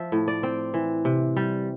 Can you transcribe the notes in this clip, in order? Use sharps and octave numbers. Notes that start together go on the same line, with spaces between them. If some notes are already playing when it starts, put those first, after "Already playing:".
Already playing: F3 E5
A2
D5
C4
E3
C3
G3